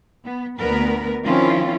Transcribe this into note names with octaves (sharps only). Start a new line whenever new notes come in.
B3
D2 B3 A#4 B4
D#3 F3 C4 C#4 E4 F4